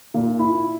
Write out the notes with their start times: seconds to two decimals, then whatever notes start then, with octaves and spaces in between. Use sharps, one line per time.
0.14 A#2
0.39 E4